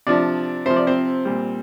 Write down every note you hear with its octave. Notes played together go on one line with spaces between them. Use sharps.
C3 F3 D4 D5
C3 F3 C5
D5
C4 C5
A#2 G3